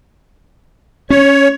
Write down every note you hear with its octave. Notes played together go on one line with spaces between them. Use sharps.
C#4 C#5